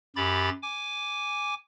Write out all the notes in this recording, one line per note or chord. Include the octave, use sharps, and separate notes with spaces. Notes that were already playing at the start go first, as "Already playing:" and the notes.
F#2 G4 B5 A6
G#5 D6